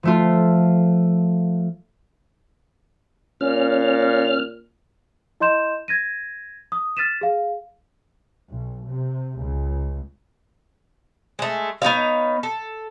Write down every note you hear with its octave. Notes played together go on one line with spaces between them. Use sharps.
F3 A3 F4
A#2 C#4 F6
E4 D#5 C6 G6 E7
G#6 A#6 D#7
D#6
F6 A6 B6 D#7 E7
G#4 F5
B1
C3
C#2
G#3 A3
B3 D#4 C#5 F5
A4